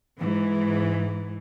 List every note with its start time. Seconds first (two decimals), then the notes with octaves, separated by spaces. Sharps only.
0.18 G#2 E3